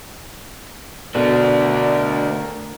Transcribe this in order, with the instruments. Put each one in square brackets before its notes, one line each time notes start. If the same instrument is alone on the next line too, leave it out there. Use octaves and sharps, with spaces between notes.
[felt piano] B2 [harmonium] D3 A#4 [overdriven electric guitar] A3 D4